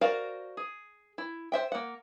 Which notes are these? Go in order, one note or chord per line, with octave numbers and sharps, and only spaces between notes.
F#4 A#4 C5 D5 F5
G#4
E4
C5 E5 G5
A#3 F#5